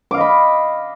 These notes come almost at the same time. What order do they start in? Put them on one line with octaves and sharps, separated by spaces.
D6 F5 D#5 B5